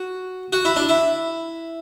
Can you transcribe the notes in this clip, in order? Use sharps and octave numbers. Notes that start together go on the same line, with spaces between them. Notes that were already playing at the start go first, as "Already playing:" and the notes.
Already playing: F#4
F#4
E4
D4
E4